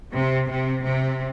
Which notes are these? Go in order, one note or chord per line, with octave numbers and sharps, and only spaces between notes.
C3
C3
C3